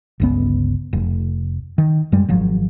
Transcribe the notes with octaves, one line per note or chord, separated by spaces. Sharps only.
G1 C#2 B3
F1
D#3
F#2 G3 G#3
G#1 F3 F#3